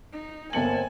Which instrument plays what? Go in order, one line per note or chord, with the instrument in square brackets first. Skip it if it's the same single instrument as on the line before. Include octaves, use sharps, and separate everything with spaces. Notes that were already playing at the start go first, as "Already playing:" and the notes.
[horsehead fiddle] D#4
[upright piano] G1 C#7 F#7 [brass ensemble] A#3 C4 A5 [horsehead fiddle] G#5